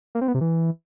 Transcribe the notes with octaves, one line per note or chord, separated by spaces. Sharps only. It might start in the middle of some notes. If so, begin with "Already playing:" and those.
A#3
C4
B3
C3
E3